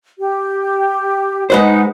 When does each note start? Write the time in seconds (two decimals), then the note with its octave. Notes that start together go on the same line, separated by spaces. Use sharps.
0.18 G4
1.50 G#3 D#4 B4 C5 F#5